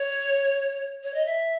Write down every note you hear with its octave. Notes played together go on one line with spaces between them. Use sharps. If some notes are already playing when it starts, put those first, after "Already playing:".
Already playing: C#5
C#5
D#5
E5